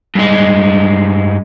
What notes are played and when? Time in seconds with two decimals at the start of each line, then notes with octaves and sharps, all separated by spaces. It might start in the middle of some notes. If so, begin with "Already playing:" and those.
0.15 G2 G#3